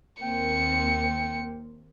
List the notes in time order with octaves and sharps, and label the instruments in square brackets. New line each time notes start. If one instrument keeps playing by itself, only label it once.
[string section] D#2 A#3 C4 [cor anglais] G5 [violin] C#7